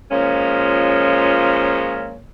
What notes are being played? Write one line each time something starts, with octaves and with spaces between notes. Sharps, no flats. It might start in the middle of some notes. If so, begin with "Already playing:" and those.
A#2 F3 G#3 C#4